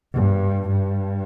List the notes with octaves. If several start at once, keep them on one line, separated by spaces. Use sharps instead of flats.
G2
G2